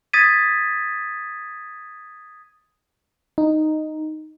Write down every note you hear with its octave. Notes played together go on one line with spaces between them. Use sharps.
D#6 G#6 A6 B6 D#7
D#4